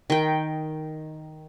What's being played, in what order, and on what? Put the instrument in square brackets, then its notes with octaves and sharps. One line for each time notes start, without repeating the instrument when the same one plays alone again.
[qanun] D#3 G5